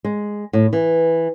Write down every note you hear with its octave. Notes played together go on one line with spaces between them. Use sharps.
G#3
A2
E3